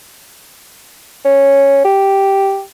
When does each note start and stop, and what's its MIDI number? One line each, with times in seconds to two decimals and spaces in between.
1.25 1.82 61
1.85 2.62 67